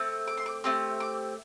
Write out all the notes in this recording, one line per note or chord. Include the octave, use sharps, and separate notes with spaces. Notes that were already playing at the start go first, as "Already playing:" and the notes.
Already playing: A3 C4
D6
C6
D6
A3 C4 G4 C6
D6